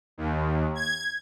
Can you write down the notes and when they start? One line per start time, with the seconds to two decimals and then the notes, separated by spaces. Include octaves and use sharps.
0.18 D#2
0.75 G#6